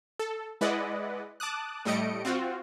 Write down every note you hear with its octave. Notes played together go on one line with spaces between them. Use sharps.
A4
G#3 E4 B4 D5 D#5 F#5
A5 D6 D#6 F#6
A2 G3 A3 D#5 C#7 D7
C4 F4 F#4